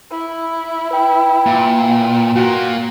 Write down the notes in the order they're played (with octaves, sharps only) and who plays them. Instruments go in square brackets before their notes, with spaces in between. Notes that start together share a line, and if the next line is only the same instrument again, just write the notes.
[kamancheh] E4
[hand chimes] B4 G5
[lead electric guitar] A#2
[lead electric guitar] A#2 A#3 [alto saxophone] F#4